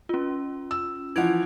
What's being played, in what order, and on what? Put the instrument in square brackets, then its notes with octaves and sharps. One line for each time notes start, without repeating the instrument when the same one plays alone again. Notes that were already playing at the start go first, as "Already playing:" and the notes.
[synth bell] C#4 F4
[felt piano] E6
[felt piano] E3 F3 F#5 [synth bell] G#6 D7 F7